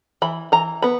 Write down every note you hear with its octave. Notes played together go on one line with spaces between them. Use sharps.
E3 B5
E3 A#5
B3 B5